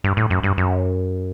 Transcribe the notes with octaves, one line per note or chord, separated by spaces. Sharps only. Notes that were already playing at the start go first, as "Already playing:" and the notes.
G2
A2
F#2
G2
F#2